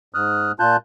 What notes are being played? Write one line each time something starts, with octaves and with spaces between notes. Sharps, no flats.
G#2 D#6 F6 F#6
A#2 F4 A5 F#6 G6